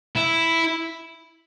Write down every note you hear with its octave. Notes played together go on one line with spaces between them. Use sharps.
E4